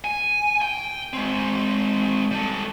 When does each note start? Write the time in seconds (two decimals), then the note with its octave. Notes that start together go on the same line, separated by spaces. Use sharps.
0.04 G#5
0.62 G5
1.13 G#3 C4
2.31 G3 A4